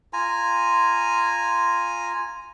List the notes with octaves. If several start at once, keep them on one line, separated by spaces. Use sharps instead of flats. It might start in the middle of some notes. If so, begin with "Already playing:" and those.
F4 G#5 A#5